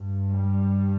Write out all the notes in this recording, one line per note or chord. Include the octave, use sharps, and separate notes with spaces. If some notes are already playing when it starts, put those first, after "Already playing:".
Already playing: G2
G3